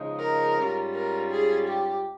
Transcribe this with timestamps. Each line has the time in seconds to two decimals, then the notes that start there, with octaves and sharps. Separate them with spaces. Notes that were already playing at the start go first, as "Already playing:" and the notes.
Already playing: C#3 F3 G#3 D#4
0.19 A#4
0.57 G#2 G3 C#4 F4
0.95 A#4
1.31 G#4
1.69 G4